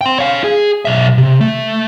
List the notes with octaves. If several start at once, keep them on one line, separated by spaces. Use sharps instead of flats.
G5 C6
C#5 F5
G#4
B1 E5
C3
A3